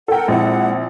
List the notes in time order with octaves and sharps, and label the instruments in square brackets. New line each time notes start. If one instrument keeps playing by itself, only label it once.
[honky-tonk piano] A4 G5 [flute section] A#4 F#5
[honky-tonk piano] A#1 [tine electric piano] G#3 C4 E4 [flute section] F#5